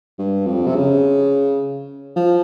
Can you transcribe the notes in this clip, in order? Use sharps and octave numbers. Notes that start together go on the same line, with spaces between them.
G2
F2
C3
C#3
F3